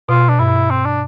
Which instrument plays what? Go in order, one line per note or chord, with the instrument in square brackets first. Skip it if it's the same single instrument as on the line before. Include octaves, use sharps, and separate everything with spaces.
[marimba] B2 [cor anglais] F4
[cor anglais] D4
[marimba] G2 [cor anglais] E4
[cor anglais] C4
D4